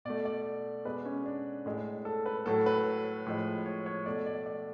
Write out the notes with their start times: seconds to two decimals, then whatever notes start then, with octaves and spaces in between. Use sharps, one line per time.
0.05 B2 A3 D5
0.25 D5
0.85 B2 G#3 B4
1.05 C#4
1.26 D4
1.66 A2 G#3
2.05 A4
2.26 B4
2.46 A2 F#3 A3 A4
2.66 B4
3.26 A2 F3 G#3
3.66 C#5
3.86 C#5
4.06 B2 A3 D5
4.26 D5
4.46 D5